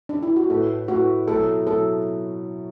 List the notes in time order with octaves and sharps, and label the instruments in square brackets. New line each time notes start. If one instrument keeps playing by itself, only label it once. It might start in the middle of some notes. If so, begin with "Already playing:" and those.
[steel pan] D4
E4
F#4
[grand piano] A2 A3 E4 B4 [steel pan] A4
[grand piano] A2 A3 E4 B4 [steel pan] F#4
[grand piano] B2 F#3 A3 E4 [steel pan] A4
[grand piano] B2 F#3 A3 E4 [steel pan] A4